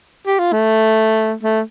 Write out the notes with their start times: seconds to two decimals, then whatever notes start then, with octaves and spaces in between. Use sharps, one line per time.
0.26 G4
0.39 F4
0.53 A3
1.43 A3